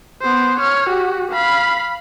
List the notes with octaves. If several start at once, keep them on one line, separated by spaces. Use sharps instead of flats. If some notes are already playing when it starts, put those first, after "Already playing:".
B3 C5
C#5 F6
F#4 G4
F5 B5